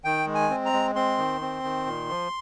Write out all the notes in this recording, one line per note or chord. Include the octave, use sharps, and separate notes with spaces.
D#3 G5
G#3
G#5
C4
A#5
G#3
C4 C6
D#3
C4
D#3
A#2
F3